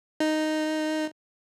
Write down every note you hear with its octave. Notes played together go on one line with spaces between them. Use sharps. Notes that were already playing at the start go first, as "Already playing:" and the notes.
D#4